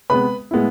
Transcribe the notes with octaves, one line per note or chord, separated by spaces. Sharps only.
C3 G#3 B3 B4 B5
A2 G#3 B3 E4